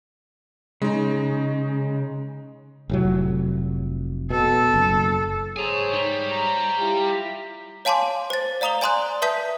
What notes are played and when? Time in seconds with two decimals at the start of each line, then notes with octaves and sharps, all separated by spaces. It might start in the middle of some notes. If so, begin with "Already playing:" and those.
0.82 C#3 G#3 D#4
2.89 F1 A2 F#3
4.30 B2 A4
4.74 F#1
5.57 G#2 G#4 C5 C#5 G#5 A#5
5.93 G3 D#4
6.31 A#5
6.78 E4 F4 G4
7.85 C#5 F5 G#5 A5 C6 D6
8.30 C5 A6
8.61 D5 F5 A#5 D#6 F7 G7
8.81 D5 G#5 A#5 C6 D#6 F#6
9.22 B4 E5 A5 D#6 G6 B6